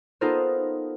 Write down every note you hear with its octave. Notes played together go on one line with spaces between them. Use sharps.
B3 D#4 F4 A4 A#4 C5